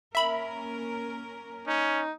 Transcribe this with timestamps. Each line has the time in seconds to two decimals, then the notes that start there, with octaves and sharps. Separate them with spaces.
0.15 A#3 C#4 A#4 E5 B5
1.67 C#4 D#4